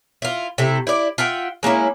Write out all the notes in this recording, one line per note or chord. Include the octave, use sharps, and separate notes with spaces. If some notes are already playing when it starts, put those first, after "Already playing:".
E4 F4
C3 A3 E4 A4
E4 D5
F4 E5 F#5 G5
G#3 A#3 C#4 E4